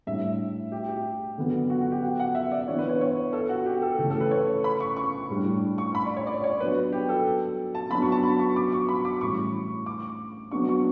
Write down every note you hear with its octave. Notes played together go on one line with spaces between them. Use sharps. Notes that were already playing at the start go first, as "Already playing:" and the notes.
A2 G3 D4 E5
G4
G4
D3 F#3 B3
F#4
F#4
G4
F#5
F#5
E5
D5
E3 B3 D4 C#5
B4
C#5
C#5
A4
F#4
G4
A4
C#3 E3 A3 C#4 G4
A4
B4
C#5
B5
C#6
C#6
A2 G3 D4
C#6
B5
D5
C#5
D5
C#5
F#3 B3 D4 B4
G4
A4
A5
F#3 B3 D4 B5
C#6
A5
B5
C#6
D6
C#6
B5
D6
A2 E3 G3 C#4 C#6
D6
F#3 B3 D4 C#6
C#6